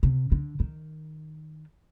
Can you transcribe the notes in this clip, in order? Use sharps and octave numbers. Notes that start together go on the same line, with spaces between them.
C3
D3
D#3